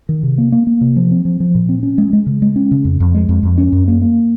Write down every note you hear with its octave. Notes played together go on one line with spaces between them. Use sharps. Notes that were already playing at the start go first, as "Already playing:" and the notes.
D#3
C3
A#3
A#3
A#3
C3
F3
C4
F3
F3
A#2
C4
C#4
G#3
G#3
C#3
G#3
C#4
C#3
F2
F2
G#3
F2
F2
C#4
F#2
A#3
A#3